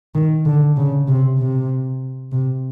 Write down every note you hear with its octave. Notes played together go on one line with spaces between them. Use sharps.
D#3
D3
C#3
C3
C3
C3